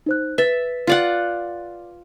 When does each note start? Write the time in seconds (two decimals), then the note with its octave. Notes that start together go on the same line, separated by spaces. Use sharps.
0.06 D#4 C5 F#6
0.38 B4 E5 A6
0.87 F4 D5 F#5